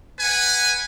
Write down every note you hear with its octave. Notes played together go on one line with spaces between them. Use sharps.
B4 F#5 G#5